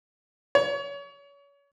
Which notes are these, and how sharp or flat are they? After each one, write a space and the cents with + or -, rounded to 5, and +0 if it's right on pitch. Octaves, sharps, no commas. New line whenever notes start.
C#5 +30